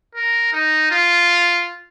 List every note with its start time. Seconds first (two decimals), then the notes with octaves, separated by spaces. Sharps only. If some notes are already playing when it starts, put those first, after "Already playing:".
0.15 A#4
0.53 D#4
0.91 F4